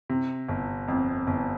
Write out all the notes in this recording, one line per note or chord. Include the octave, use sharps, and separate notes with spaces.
C3
G1
F2
G1